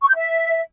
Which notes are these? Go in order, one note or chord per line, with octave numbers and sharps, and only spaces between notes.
C#6
G6
E5